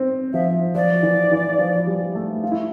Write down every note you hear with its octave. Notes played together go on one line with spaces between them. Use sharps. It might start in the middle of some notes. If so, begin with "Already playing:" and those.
Already playing: C4
F3 E5
F3 D5
E3
E3
F3
G3
A3
F4
E4